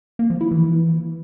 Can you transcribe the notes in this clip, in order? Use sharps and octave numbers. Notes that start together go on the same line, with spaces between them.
A#3
F3
E4
E3